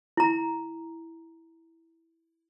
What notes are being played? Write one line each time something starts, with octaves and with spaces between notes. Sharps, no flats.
E4 A#5